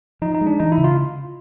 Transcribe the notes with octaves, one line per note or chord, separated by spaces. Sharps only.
F3 D#4
D#4
G#3
D4
E3 D#4
E4
C#3
F4